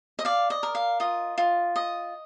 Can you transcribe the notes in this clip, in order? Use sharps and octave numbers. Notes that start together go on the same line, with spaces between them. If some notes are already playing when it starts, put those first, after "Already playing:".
D#5
D5 F5
D#5
A#4
F5
F4 D#5
F4
D#5